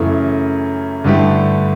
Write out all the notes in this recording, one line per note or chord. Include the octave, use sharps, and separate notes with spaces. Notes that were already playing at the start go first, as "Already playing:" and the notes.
Already playing: F#2 C#3 E3 A3 E4
G2 D3 A3 E4 G4